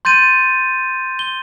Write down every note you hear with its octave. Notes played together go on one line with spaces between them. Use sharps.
C6 G6 A6 D#7
G7